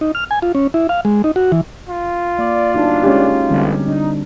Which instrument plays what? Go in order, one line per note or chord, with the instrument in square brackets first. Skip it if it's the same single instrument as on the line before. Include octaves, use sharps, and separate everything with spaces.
[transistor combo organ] D#4
F6
G#5
F4
C#4
E4
F5
G#3
D#4
F#4
E3
[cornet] F4
[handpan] A#3 [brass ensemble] D5
[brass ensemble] G1 D4 [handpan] D#4 F#4
[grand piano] G#3 C#4 G4
[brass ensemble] A1 F2 [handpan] D3 G3 C4
[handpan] D4 [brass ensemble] D#4